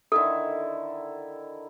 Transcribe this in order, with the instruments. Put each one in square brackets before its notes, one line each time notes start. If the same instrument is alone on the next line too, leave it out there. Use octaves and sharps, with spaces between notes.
[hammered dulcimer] D3 D#3 E4 [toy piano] A4